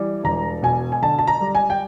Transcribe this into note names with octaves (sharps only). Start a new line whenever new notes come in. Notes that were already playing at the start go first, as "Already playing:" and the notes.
Already playing: E3 G3
E1 A#5
B2 G#5
G#5
D3 A5
A5
A#5
G3
G#5
G5